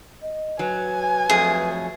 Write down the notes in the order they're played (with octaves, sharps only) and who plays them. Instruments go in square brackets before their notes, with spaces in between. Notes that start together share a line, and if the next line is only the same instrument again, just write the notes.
[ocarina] D#5
[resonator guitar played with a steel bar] F#3 [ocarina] B4 [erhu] G#5
[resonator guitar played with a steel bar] F2 F#3 A3 [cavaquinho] G#4